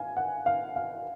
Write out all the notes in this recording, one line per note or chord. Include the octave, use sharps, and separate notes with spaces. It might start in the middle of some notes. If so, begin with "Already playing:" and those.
Already playing: F5 G#5
F#5
F5
F5